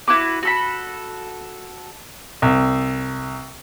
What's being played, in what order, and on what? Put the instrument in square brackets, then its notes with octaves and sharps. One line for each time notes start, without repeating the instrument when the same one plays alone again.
[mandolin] E4 F#4 B4 D6
F#4 A4 B5
[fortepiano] C2